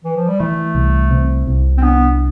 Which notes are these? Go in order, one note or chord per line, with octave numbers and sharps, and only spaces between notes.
E3
F3
G3
E3 A3
C2
C3
C2
C4
B3 D4